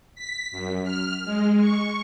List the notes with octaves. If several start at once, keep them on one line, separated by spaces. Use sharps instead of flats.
B6
F#2
F6
G#3
C#6